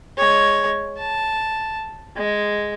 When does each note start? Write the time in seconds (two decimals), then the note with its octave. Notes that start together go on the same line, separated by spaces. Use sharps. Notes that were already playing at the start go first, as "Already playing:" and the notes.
0.18 G#3 C#5
0.98 A5
2.17 G#3